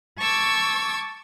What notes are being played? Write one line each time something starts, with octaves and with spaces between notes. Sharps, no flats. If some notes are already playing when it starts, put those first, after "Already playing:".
A5 C#6 D6 E6 G#6